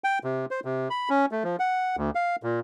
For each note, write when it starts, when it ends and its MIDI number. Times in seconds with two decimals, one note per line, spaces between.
0.04 0.19 79
0.24 0.46 48
0.51 0.60 72
0.65 0.88 48
0.90 1.09 83
1.10 1.26 61
1.32 1.43 57
1.44 1.56 53
1.59 1.96 78
1.97 2.10 38
2.15 2.36 77
2.43 2.60 46